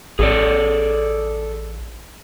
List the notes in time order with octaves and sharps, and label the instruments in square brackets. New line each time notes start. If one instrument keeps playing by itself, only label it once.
[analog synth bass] A1 [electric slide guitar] G#4 A4 D5